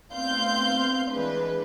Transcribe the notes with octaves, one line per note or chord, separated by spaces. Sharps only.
A3 B3 C4 F5 C6 G6
E3 G#3 D4 B4